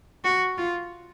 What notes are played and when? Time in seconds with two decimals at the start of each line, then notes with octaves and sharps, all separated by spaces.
0.24 F#4
0.58 F4